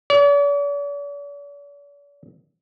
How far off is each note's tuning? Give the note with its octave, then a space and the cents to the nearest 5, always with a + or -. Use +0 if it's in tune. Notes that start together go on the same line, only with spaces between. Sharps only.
D5 -45